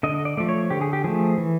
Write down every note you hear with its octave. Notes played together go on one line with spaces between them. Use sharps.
D3 D#5
D5
F3 A3 D5
C#5
D3 G4
G#4
G4
F3 A3 G#4
E3